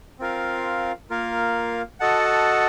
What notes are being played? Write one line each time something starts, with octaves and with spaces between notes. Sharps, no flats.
C4 F4 A#4 F5
A#3 F4 A#4 F5
F#4 A4 D#5 F#5 A5